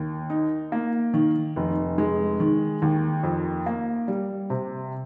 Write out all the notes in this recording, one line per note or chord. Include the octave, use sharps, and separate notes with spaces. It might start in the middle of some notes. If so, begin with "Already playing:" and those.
Already playing: D#2
D#4
A#3
D#3
F1
G#3
D#3
D#2
F2
A#3
G3
C3